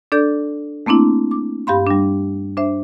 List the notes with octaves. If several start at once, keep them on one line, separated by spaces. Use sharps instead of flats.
D4 A4 D5 G6
A3 A#3 C4 D4 E4
D6
G2 G4 F5 B5 C6
G3 D4
D4 C5 E5